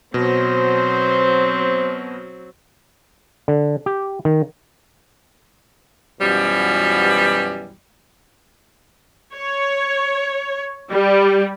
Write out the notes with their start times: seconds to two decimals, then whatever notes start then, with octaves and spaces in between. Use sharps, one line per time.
0.14 B2 F#3 C4 C5
3.48 D3
3.86 G4
4.25 D#3
6.20 F#2 B2 E3 F3 G3
9.34 C#5
10.91 G3